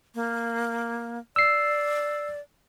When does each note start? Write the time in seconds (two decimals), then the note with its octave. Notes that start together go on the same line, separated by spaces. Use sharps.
0.15 A#3
1.36 D5 E6 C7